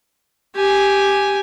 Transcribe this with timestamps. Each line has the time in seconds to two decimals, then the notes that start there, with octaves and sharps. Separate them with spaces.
0.55 G4 G#5